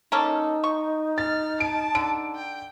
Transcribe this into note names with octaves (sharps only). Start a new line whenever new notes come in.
A#3 C#4 D#4 A4
C#6
F6 A6
A5 D7
D3 D7
G5